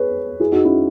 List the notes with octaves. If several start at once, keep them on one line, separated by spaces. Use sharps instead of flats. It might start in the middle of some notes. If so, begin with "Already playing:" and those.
Already playing: G#4 B4 C#5
E4 G#4
D#4 F#4
C#4 E4